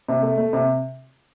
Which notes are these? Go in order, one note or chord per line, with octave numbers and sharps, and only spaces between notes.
C3
A3
A3
C3